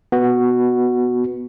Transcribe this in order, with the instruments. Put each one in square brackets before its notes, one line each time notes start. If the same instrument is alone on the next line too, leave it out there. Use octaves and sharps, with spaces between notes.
[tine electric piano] B3 F#4